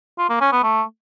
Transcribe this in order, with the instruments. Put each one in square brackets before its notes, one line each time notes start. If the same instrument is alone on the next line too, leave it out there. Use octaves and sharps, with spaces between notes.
[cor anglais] F4
A#3
C#4
B3
A3